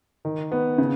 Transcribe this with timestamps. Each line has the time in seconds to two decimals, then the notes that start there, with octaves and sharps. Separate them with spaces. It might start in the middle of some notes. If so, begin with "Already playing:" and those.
0.25 D#3
0.52 B3
0.78 C#3